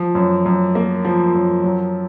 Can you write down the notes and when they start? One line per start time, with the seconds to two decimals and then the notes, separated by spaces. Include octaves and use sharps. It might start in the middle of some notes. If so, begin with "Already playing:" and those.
Already playing: F3
0.15 F#2
0.46 F#2
0.75 A#3
1.05 F3
1.35 F#2
1.64 F#3